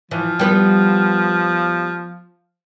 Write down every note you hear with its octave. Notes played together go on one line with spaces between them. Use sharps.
E3 F3
G3 B3 B4